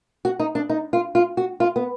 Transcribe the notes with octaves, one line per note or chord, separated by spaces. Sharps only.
F#4
D#4
D4
D#4
F4
F4
F#4
F4
B3